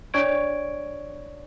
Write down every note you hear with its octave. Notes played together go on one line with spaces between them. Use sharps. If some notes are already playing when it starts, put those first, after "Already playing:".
D4 C#5 D5 C#6 G#6 D7